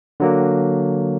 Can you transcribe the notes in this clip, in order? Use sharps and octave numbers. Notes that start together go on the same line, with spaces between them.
D3 F#3 A#3